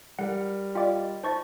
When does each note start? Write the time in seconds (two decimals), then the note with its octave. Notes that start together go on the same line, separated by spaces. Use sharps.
0.19 G3 A#4 F#5
0.75 F4 D5 D#5 F5 G5 D6
1.23 D#4 F4 C5 E5 C#6 A6